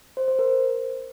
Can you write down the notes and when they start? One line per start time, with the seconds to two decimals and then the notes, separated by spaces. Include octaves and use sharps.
0.17 C5
0.28 C5
0.39 A#4